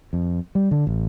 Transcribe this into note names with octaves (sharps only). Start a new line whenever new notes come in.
F2
G3
D3
A1